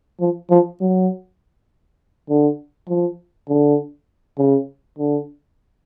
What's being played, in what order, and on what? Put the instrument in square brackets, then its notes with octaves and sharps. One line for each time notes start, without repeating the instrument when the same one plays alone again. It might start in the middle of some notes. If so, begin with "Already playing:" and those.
[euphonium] F3
F3
F#3
D3
F3
D3
C#3
D3